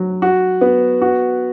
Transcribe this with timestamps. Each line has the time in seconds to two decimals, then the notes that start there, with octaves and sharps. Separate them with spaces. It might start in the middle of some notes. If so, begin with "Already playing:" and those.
Already playing: F#3
0.22 F#4
0.61 B3
1.02 F#4